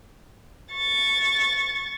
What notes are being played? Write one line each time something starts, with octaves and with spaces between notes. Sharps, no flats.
C#6 A6